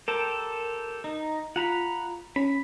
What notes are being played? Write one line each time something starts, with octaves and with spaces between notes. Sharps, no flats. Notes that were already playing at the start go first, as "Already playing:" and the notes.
G4 A4 A#4 C5
D#4
F4 F#5 A#5 B5
C#4 B5